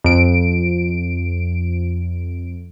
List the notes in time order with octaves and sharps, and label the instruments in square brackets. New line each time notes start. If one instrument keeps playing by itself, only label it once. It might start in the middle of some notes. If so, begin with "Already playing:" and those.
[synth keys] F2 D7